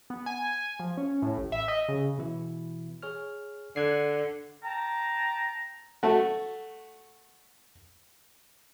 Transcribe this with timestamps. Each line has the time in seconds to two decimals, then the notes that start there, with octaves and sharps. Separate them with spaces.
0.10 B3
0.26 G#5
0.53 G#5
0.79 F3
0.97 C#4
1.22 A2
1.38 A1
1.52 E5
1.68 D#5
1.88 C#3
2.18 B2 E3 E4
3.03 G#4 C#5 F6
3.76 D3 F#6 G#6 C7
4.63 G5 A5 A#5
6.03 A3 F#4